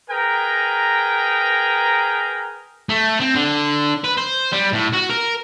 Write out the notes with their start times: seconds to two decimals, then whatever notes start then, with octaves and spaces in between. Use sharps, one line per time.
0.10 G#4 A#4 B4 G5 A#5
2.89 A3
3.21 C4
3.35 D3
4.04 B4
4.17 C5
4.53 G3
4.73 A2
4.93 F#4
5.10 A#4